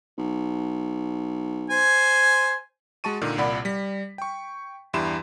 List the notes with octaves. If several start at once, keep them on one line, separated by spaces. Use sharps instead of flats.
B1
C5 G#5
G#3 F#4 A5 C#6 D#7
A#2 D3 D#3
C2 A#2 D5 F#5 B5
G3 B6
G5 C#6
E2 G2 E4 G4 C6 E7